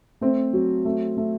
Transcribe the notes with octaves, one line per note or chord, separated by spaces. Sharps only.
A3 C4
F#3
A3
A3